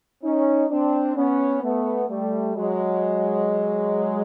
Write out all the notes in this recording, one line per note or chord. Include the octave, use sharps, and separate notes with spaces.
C#4 D#4
C4 D4
B3 C#4
A3 B3
G3 A3
F#3 G#3